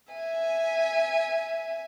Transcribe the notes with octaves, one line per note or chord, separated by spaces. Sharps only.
E5 G#5